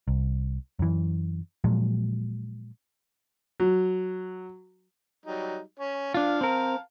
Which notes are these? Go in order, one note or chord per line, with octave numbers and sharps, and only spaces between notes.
C2
F#2 E3
A#2 F3 F#3 G#3
F#3
F#3 G3 D#4
C#4 C#5
D4 F4 F5 A5
C4 A#4